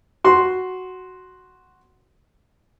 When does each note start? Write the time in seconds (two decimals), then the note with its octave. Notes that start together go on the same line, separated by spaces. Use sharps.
0.24 F#4 C6